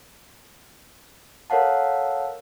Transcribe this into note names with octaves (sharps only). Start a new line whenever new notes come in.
A4 A#4 C#5 F5 F#5 A5